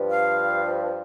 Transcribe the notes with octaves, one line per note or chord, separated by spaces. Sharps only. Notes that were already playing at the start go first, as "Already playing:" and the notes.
Already playing: G2 F3
F5